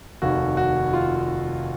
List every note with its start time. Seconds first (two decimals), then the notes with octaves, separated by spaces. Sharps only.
0.22 F1 D#2 D#3 F#4
0.57 F#4
0.93 F4